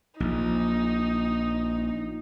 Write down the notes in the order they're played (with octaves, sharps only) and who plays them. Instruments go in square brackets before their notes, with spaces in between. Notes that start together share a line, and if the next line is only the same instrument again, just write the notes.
[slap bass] A#1 [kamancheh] D#4